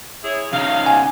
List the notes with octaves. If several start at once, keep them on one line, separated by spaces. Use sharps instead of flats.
E4 G#4 C#5
C#3 D#4 F5
G#5